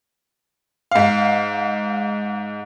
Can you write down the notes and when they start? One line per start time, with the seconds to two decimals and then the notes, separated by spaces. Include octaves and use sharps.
0.91 G#2 F5